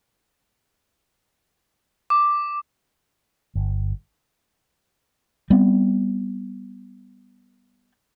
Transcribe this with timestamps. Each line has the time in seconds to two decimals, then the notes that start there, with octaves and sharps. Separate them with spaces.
2.10 D6
3.55 G1
5.50 G3 B3 C4